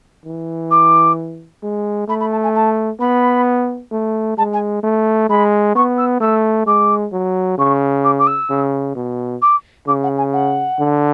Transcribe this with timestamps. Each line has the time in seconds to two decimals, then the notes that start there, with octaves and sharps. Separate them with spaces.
0.26 E3
0.70 D6
1.63 G#3
2.08 A3 B5
2.20 B5
2.31 A5
2.43 G#5
2.55 A5
3.00 B3 B5
3.91 A3
4.37 G#3 A5
4.53 G#5
4.83 A3
5.29 G#3 B5
5.75 B3 C#6
5.98 E6
6.20 A3 E6
6.66 G#3 D6
7.12 F#3
7.58 C#3 C#6
8.04 D6
8.19 D6
8.27 E6
8.50 C#3
8.95 B2
9.42 D6
9.87 C#3 D6
10.02 F#5
10.18 G#5
10.33 F#5
10.79 D3